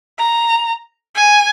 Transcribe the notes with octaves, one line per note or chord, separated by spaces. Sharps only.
A#5
G#5